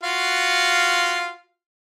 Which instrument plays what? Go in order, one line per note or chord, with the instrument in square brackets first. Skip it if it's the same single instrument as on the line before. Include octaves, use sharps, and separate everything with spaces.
[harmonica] F4 F#4 F5